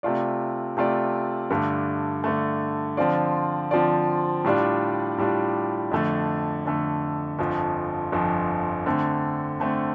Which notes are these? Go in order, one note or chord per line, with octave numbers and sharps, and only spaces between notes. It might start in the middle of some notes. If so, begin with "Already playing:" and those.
C3 A3 F4 D5
C3 A3 F4 D5
G2 D3 A3
G2 D3 A3
D3 F3 C4 F4 D5
D3 F3 C4 F4 D5
A2 G3 D4 F4 D5
A2 G3 D4 F4 D5
F2 D3 A3
F2 D3 A3
G1 F2 F3
G1 F2 F3
D3 A3 C4
D3 A3 C4